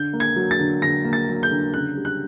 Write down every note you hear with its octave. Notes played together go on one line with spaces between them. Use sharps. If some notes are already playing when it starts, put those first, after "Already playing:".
Already playing: D3 G6
A#3
G#6
F#3
A6
D3
D3 A#6
A#3
A6
F#3
G6
D3
C#3 F#6
G3
F#6